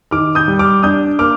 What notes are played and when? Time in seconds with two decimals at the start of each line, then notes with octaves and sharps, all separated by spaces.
0.11 D#3 D6 F6
0.35 D#6 G6
0.48 G3
0.59 D6 F6
0.83 D4 D#6 G6
1.19 A#3 D6 F6